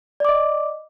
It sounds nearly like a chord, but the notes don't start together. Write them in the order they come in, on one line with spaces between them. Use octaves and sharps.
D5 D6 D#5